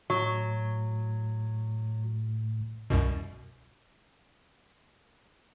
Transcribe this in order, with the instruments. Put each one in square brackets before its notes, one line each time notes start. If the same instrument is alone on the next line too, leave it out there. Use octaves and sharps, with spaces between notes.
[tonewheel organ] A2 [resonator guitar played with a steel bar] F#3
[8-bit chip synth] C2 F#2 B2